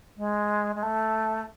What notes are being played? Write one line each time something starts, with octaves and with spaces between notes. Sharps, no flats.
G#3
G#3
A3